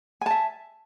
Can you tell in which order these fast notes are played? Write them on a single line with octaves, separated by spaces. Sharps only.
G#5 A5 E5